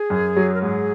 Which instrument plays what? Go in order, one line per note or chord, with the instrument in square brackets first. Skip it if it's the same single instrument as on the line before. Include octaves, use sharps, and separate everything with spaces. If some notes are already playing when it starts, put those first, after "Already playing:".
Already playing: [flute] G#4
[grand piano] F#2
F#3
[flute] A#4
[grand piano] G#2 [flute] G#4